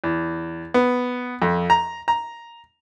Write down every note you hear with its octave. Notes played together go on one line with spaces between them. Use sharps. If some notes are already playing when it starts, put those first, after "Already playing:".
E2
B3
F2
A#5
A#5